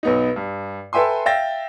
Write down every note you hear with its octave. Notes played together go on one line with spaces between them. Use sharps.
B1 B3 D#4
G2
A4 B4 E5 G5 G#5 C6
E5 F5 G5 A6 A#6